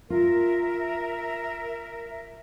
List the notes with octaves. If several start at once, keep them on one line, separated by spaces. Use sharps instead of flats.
F4 A#4 E5